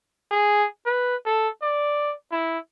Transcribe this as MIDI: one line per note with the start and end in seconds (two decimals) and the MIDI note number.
0.31 0.66 68
0.86 1.16 71
1.26 1.49 69
1.62 2.13 74
2.32 2.59 64